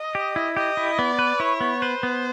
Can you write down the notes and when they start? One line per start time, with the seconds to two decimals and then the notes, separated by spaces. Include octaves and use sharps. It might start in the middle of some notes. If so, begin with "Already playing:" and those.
Already playing: D#5
0.15 G4
0.36 E4
0.56 G4 D#5
0.77 E4
0.98 B3 D5
1.19 B4
1.40 E4 C#5
1.61 B3
1.82 B4 C5
2.03 B3